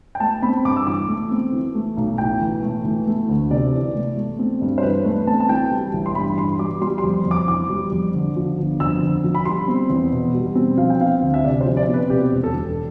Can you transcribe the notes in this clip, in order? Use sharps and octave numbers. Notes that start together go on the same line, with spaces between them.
G5
A3 A5
C4 B5
G2 D6
E6
E3 D6
A3
C4
E3
A3
B1
A2 G5
E3
A3
E3
A3
D2
C3 D5
E3
A3
A3
C4
G2
C5
E3 B4
A3 B4
C4 A5
A5
E3 G5
G3
A1
C6
G2 B5
E3 C6
G3 D6
G3 C6
C6
F2
F2
D6
E3 D6
G3
F2
D3
F3
G1
F2 E6
D3
F3
B5
G3 C6
C4
E2
B2
G3
C4
F3 F5
G5
C4 F5
D2
E5
C3 D5
C5
F3
D5
C4
B4
B2 G4
E1
A4
E1